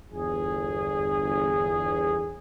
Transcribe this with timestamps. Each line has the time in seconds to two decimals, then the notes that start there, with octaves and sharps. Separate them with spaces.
0.12 G1 E2 G#4